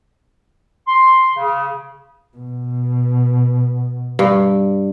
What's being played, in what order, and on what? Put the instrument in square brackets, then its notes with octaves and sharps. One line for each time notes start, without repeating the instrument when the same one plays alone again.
[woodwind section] C6
C#3
[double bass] B2
[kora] G2